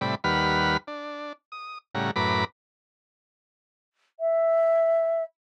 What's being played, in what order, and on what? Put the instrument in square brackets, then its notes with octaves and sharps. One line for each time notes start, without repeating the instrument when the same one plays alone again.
[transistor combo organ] A2 C3 G3 D5 B5
D#2 G3 B4 F#5 B5 F6
D4
D#6
A2 C#3 G3 F#5 A#5
F#2 A2 B4 A#5 B5 D6
[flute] E5